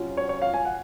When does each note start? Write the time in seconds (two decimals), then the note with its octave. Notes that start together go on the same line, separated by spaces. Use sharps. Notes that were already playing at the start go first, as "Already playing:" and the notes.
Already playing: C3 F#3 C#4 F4
0.17 C#5
0.29 C#5
0.42 F5
0.54 G#5
0.65 F#5